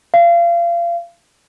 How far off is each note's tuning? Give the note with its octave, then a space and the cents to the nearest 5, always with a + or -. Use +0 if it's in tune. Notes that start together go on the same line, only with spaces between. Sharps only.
F5 -30